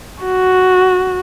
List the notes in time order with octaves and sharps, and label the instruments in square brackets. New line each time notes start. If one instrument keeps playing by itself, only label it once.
[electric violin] F#4